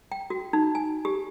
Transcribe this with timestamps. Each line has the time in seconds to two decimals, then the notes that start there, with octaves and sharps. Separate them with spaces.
0.12 G5
0.30 F#4
0.53 D#4
0.75 G#5
1.05 G4